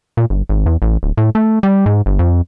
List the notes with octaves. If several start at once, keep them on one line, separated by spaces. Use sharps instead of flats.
A#2
G1
G#1
E2
A1
D1
A2
A3
G3
G#2
G1
F2